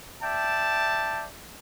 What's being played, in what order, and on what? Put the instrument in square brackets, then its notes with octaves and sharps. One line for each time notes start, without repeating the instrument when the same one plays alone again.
[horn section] D5 E5 G5 A5